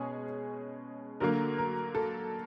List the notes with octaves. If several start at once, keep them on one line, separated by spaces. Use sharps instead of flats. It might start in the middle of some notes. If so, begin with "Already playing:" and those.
Already playing: B2 G#3 C#4 G#4
D3 F#3 A#3 A#4
A#4
A4